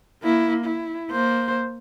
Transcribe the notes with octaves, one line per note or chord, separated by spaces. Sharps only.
A#3 E4
E4
A#3 C5